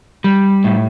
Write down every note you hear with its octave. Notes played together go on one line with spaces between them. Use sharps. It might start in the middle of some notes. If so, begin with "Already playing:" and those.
G3
A2